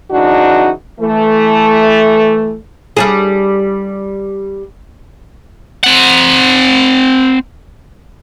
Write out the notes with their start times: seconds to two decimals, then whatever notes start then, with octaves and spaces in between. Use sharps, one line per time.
0.11 C#3 E3 D4 D#4 F#4
0.99 E3 A3
2.97 G3 D4 G#4
5.84 C4 F#5